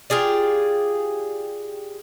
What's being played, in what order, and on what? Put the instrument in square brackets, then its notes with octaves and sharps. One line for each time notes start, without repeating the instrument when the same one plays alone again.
[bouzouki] F4 G4 G#4 D5